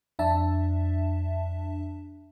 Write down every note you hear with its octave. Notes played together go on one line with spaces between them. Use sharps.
F2 D4 E5 A5